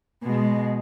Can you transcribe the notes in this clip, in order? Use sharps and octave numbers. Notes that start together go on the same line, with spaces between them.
B2 G#3